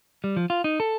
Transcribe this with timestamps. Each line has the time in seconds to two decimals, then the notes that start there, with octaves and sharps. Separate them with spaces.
0.24 G3
0.37 F3
0.50 F4
0.64 D#4
0.80 A4